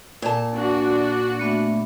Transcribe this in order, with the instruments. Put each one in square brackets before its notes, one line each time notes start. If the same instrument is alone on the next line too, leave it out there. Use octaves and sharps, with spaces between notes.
[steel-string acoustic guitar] A#2 A5
[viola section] D4 F#4
[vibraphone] A3 B3 E5